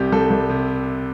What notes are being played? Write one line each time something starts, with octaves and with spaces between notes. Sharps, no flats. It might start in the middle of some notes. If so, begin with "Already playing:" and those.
Already playing: C2 C3 G4
C2 A4
C2
C3